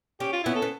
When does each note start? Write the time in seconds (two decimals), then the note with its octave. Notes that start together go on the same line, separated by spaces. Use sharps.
0.20 C#4 G4
0.32 F4
0.43 B3 C#4 E4
0.55 A4
0.62 B3